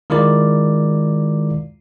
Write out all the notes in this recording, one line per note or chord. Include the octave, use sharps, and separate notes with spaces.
D#3 G#3 E4 F4 A#4 D5